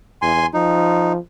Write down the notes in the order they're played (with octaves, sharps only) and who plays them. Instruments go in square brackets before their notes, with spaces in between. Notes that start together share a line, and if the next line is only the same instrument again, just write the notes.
[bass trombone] E2 [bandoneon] G#5 C6
[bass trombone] F3 [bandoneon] D#4